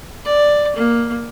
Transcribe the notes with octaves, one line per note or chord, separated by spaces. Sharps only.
D5
A#3